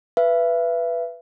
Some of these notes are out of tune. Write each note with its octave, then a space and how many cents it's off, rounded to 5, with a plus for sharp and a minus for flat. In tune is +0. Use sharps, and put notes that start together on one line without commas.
B4 +0 E5 +35